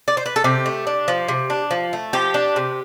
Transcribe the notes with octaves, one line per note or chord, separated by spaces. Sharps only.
D5
C5
B4
A4
C3 G4
A3
D4
F3
C3
D4
F3
A3
F3 G4
D4
C3